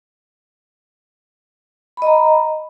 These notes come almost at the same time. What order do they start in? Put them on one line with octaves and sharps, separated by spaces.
B5 D#5 A#5